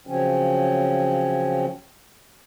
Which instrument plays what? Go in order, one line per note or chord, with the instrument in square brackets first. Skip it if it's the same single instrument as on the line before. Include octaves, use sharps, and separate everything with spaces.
[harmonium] C#3 F3 F#3 C4 C#4